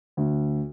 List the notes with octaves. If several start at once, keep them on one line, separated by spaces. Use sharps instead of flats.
D2